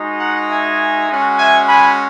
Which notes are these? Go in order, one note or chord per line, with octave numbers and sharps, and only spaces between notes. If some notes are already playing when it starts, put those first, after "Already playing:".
Already playing: G#3 D#4 F#4
F#5 A#5
E5 G#5
G#3 C#4 F#4
E5 G#5
G#5 B5